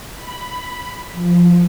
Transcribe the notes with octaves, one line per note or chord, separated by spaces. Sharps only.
B5
F3